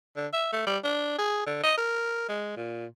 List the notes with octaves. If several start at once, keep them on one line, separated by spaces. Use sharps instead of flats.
D3
E5
A3
G3
D4
G#4
D3
D#5
A#4
G#3
A#2